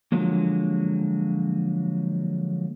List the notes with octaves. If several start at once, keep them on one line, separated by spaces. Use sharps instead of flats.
D3 F3 F#3 G#3 A#3